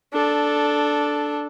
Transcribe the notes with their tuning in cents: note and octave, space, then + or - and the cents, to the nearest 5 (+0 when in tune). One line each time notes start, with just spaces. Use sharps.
D4 +0 A4 -10